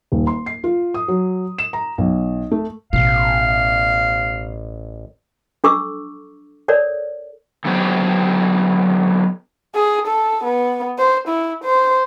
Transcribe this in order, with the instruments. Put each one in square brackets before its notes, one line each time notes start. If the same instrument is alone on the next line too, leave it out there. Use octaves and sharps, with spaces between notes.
[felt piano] D#1
C6
C7
F4
D#6
F#3
E7
A#5
B1
A3
[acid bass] A1 [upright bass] B2 [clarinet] F5
[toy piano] D4 A4 C#6 D6 E6
A4 A#4 C#5 D5
[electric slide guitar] D3 F#3 B3 G4 C5
[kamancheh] G#4
A4
B3
C5
E4
C5